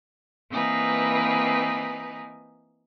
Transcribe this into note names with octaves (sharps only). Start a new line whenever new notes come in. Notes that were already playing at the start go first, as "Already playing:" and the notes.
E3 A#3 C4 D#4 B4 G#5